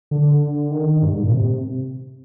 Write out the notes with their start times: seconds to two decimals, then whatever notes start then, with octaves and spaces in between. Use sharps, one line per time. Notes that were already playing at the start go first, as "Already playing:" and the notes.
0.11 D3
0.71 D#3
1.02 G2
1.12 G#2
1.23 A#2
1.33 C3